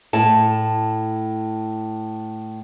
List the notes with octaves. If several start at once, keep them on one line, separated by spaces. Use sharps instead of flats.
A2 A5